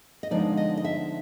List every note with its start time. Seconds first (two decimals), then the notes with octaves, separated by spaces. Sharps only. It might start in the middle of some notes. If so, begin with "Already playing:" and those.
0.23 D#5
0.31 D3 F3 G#3 B3 D#4 D5
0.57 D#5
0.77 D#5
0.85 E5